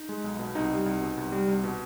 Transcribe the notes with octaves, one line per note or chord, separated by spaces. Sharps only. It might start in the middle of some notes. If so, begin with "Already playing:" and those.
Already playing: D#4
G#3
B1
B2
C2 D#4
G3
C2
B2
C2
G3
C2
B2